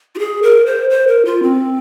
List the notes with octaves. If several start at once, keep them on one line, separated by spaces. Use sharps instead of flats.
F4
G#4
A#4
C5
C5
A#4
F4
C4